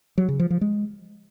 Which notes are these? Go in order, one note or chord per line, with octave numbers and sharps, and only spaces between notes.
F#3
C#3
F3
F3
G#3